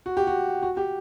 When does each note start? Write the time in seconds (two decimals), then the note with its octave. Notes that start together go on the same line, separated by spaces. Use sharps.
0.06 F#4
0.17 G4
0.27 F#4
0.63 F#4
0.77 G4